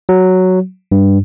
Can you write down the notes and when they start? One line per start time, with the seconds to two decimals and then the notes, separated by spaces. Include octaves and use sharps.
0.09 F#3
0.92 G2